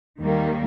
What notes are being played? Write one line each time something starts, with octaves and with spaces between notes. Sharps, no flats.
D#2 D#3 G3 A#3